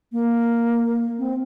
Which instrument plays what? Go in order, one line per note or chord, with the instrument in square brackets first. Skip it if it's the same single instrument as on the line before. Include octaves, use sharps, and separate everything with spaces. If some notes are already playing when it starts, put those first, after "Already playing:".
[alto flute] A#3
C4